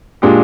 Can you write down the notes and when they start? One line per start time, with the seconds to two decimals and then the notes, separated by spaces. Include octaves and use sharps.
0.22 A#2 G#3 D4 G4